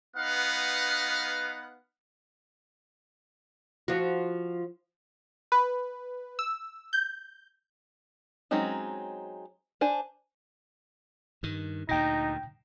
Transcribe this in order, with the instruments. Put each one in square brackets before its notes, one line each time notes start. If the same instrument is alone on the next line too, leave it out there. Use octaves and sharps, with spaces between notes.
[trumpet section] B3 D#4 B4 F5 F#5
[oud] F3 F#4
[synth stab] B4
E6
G6
[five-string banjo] F#3 G#3 C4 C#4 D#4
D4 C5 G#5
[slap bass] G2 D#3
[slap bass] D2 A#2 [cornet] D#4 [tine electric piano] G5 A#6